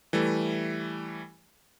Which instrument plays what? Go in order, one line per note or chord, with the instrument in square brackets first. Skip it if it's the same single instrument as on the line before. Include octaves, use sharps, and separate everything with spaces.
[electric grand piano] E3 G3 A3